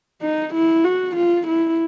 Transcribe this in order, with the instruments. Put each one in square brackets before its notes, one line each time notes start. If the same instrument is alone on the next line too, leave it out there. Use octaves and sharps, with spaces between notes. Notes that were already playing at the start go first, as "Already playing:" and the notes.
[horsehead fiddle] D#4
E4
F#4
F4
E4